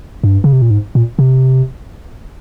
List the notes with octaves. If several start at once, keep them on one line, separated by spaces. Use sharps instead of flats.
G2
C#3
C3
A#2
G#2
A#2
C3